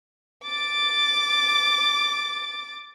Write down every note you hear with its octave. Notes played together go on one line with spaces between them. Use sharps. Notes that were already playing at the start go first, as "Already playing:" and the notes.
D6 A6